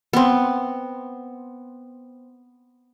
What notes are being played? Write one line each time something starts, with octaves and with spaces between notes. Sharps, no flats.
B3 C4